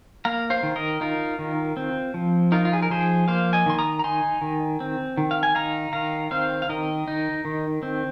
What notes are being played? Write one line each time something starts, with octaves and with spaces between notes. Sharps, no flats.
A#3 F5 A#5
C5 F5
D#3
A#4 D#5
D#4 F4 A#4
D#3
C4
F3
D#4 F4 A#4
F4
G#4
A#4
F3 G#4 C5
A#3 C5 F5
D#5 G#5
D#3 C6
A#5 D#6
A#5
D#4 G#5 C6
D#3
C4
D#3
F5
G#5
D#4 F5 A#5
D#3 F5 A#5
C4 C5 F5
F5
D#3 A#4 D#5
D#4
D#3
C4